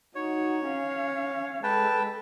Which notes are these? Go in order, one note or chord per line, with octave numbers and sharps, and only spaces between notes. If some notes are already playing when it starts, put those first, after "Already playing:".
D#4 F#4 C#5
C#4 F5
G#3 A4 B4 G5 A5